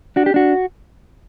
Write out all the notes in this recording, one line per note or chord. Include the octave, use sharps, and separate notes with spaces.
D4 F#4
G4
D4 F#4